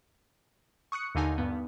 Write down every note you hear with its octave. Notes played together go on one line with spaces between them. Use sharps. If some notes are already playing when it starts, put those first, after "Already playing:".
C#6 D#6 F#6 C#7
D#2 D3 D#4 G#5
G2 B3